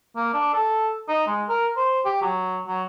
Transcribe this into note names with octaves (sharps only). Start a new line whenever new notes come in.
A#3
D4
A4
D#4
G#3
A#4
C5
G4
F#3
F#3